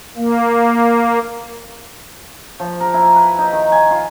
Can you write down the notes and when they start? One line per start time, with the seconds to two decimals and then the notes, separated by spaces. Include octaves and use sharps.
0.17 A#3
2.60 F3
2.80 A#4
2.94 E4
3.16 B4
3.38 D#4
3.52 D#3
3.72 G#5
3.90 F4